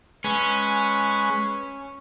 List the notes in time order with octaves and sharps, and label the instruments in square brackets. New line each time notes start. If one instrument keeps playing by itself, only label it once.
[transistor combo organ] G#3 B4 [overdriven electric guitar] C#4